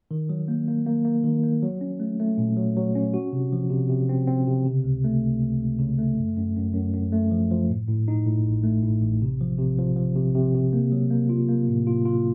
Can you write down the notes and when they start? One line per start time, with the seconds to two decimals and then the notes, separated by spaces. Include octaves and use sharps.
0.11 D#3
0.29 F#3
0.48 A#3
0.68 A#3
0.86 A#3
1.05 A#3
1.24 D#3
1.43 A#3
1.62 F#3
1.81 C#4
2.00 A3
2.20 A3
2.38 A#2
2.57 F#3
2.77 F#3
2.95 C#4
3.14 F#4
3.33 C3
3.53 F3
3.70 C3
3.89 C3
4.09 C4
4.27 C4
4.47 C3
4.66 C#3
4.84 C#2
5.04 A3
5.23 C#2
5.42 C#2
5.60 C#2
5.79 C#3
5.98 A3
6.18 F#2
6.37 F#2
6.56 F#2
6.74 F#2
6.94 F#2
7.13 A3
7.31 F3
7.51 F3
7.69 A2
7.88 A2
8.08 D#4
8.26 A2
8.45 A1
8.64 A3
8.83 A2
9.02 A1
9.22 C3
9.41 F3
9.59 C3
9.79 F3
9.96 F3
10.15 C3
10.35 C3
10.55 C3
10.73 A#3
10.92 F#3
11.10 A#3
11.30 F4
11.49 A#3
11.68 A2
11.87 F4
12.05 F4